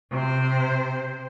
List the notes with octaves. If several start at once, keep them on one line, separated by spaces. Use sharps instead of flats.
C3 C5